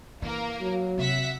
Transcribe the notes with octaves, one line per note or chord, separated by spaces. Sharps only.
E3 A#3 A#4
F#3
C3 E5 F#5 B6